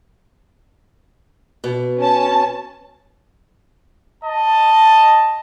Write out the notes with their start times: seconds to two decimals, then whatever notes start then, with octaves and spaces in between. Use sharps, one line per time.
1.64 B2
1.99 C#4 A5
4.24 D#5 A5